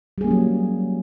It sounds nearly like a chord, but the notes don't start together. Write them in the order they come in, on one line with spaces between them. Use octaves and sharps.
G3 G#4 A#3 C#4 F#3